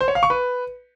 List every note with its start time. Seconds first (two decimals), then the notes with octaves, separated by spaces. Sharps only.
0.01 C5
0.08 C#5
0.15 F5
0.23 C#6
0.30 B4